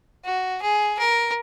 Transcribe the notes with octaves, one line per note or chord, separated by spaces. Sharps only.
F#4
G#4
A#4